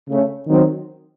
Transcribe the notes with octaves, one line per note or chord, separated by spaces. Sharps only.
C#3 A3 C#4
D#3 F#3 C4